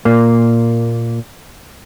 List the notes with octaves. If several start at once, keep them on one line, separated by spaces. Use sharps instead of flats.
A#2 A#3